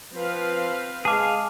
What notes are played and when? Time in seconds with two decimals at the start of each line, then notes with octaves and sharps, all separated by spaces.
0.14 F3 C4 B4 F5
1.05 G#3 G#4 F5 A5 D6